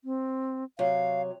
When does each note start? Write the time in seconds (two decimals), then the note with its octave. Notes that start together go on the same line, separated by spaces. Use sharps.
0.04 C4
0.79 C3 F#3 C#5 F5